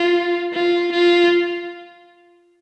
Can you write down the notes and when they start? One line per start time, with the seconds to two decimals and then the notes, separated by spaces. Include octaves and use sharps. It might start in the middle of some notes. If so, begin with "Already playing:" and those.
Already playing: F4
0.53 F4
0.92 F4